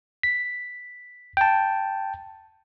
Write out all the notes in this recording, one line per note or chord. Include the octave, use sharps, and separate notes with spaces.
B6
G5 A5